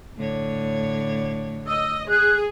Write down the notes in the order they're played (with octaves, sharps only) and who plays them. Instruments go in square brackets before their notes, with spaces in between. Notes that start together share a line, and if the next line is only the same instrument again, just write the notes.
[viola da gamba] A2 D3 C#5
[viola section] D#5 [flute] E6
[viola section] G#4 [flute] F#6